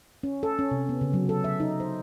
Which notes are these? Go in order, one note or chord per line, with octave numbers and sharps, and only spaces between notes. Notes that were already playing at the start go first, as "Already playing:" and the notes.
C#4
A4
C#4
C3
B3
C#3
F#3
A4
E5
D#4
C5